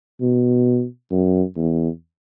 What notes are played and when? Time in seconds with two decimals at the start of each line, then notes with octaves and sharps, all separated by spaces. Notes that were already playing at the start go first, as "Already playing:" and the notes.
0.21 B2
1.11 F#2
1.57 E2